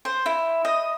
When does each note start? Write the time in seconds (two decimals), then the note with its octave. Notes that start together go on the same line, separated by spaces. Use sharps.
0.05 C5
0.26 E4
0.65 D#5